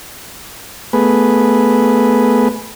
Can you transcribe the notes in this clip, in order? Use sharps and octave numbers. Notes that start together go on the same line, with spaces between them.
A3 B3 G#4 B4